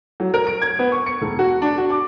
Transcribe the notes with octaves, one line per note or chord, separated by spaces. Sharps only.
F#3
A#4
D7
G#6
B3
C#6
C#7
E1
F#4
D4
F#4
D6